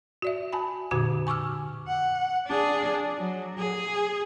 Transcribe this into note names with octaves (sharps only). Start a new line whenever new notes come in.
F#4 D5 E5
F#4 G#5 A5 B5
F2 A#2 D3 F#4 D6 G#6
G#5 C#6 D6 E6 F6
F#5
D4 G#4
F#3
G#4